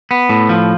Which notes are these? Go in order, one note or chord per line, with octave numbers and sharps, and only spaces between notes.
B3
A2
F3